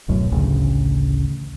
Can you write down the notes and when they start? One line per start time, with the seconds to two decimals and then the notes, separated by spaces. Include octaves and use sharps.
0.08 D1 B1 F#2 A2
0.32 A1 D2 C#3